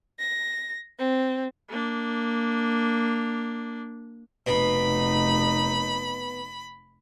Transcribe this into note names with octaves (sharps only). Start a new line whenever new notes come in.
A#6
C4
A#3 D4
F1 B2 D#4 B5